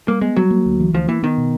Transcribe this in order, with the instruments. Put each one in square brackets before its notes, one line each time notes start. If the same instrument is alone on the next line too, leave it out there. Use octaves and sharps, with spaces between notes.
[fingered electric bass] G3 [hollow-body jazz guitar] A#3
[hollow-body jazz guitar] G#3 [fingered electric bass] B3
[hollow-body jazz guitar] F#3 [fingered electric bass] G3
[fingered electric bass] A#3
D2
E3
[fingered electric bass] D2 [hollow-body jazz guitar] F3
[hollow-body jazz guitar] E3 [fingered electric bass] A#3
[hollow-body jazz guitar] D#3 [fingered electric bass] B3
[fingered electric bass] B2